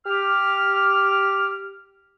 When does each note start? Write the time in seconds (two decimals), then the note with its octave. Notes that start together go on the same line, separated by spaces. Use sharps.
0.06 G4 F6